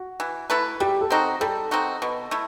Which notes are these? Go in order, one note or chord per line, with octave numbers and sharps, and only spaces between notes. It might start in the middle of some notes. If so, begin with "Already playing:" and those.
Already playing: F#4
E3
A3 E4 B4
G3 G4
A4
C4 D#4 F#4
G3 A4
C4 D#4 F#4
B2
A3 E4